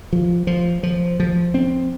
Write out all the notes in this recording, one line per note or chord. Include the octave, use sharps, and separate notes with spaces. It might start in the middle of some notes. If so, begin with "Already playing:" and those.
F3
F3
F3
F3
C4